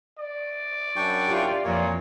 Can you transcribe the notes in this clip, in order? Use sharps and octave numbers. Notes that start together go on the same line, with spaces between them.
D5
F#2 D4 G5 C#6
E4 F4 G4
F2 A#2 E3 F3 C#5